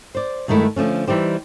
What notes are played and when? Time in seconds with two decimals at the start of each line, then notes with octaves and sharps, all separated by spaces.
0.15 C5 D5
0.48 G2 D#3 G#3 A3 E4
0.76 D3 F3 A3 C#4
1.07 E3 G3 D#4 G4 C5